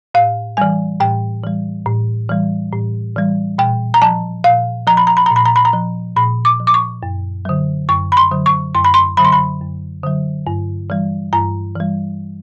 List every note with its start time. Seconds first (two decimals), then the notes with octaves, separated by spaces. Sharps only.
0.14 A2 F5
0.57 E3 G3 G#5
1.00 A2 G5
1.44 E3 G3
1.86 A2
2.29 E3 G3
2.72 A2
3.16 E3 G3
3.58 A#2 G5
3.94 A#5
4.02 F3 A5
4.44 A#2 F5
4.87 F3 A#5
4.97 B5
5.07 A#5
5.17 B5
5.26 A#2 A#5
5.36 B5
5.46 A#5
5.56 B5
5.65 A#5
5.73 F3
6.16 A#2 B5
6.45 D6
6.60 F3
6.67 D6
6.74 C#6
7.03 F#2
7.45 D3 F#3
7.88 F#2 C#6
8.12 B5
8.17 C6
8.31 D3 F#3
8.46 C#6
8.75 F#2 C6
8.84 B5
8.94 C6
9.17 D3 F#3 B5
9.25 C6
9.32 B5
9.61 F#2
10.03 D3 F#3
10.47 G2
10.90 E3 G3
11.33 G2 A#5
11.75 E3 G3